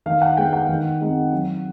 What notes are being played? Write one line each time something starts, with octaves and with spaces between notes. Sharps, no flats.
D#3 F5
F#5
G#3 B3 G5
F#5
D#3
G#3 C4 D#4
F#3